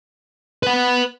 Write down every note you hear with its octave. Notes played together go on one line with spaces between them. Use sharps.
B4 F#5